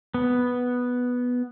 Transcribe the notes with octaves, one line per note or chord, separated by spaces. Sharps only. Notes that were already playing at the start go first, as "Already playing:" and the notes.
B3